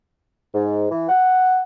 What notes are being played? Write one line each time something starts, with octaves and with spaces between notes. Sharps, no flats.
G#2
E3
F#5